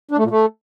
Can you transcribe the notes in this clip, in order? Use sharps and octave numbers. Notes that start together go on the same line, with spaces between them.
D4
A3
A#2
A3